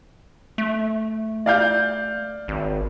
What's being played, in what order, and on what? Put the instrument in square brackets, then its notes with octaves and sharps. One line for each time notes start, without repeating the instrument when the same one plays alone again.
[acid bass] A3
[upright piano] D5 F5 G6
[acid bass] G#1